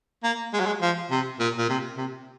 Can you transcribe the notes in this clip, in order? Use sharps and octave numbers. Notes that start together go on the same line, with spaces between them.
A#3
G#3
F#3
G#3
F3
C3
A#2
A#2
C3
C3